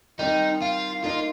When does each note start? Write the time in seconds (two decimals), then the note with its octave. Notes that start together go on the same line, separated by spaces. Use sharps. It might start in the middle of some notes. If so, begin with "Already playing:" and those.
0.19 D#3 G3 C4 D#4 G4
0.62 F4
1.04 A#3 D#4 F4 A#4